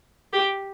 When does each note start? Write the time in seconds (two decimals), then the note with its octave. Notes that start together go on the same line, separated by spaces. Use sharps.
0.33 G4